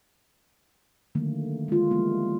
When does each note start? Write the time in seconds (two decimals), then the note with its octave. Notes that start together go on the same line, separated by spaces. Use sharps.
1.15 D3 D#3 F#3 A3 A#3
1.68 G#3 F4
1.91 F3 G3 G#3 A#3 B3 E4